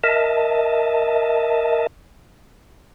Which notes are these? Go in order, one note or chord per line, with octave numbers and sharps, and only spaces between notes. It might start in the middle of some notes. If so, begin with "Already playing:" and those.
A#4 D#5 E5 A5